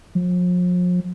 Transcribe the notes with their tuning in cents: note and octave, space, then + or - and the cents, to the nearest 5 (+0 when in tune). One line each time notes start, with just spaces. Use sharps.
F3 +40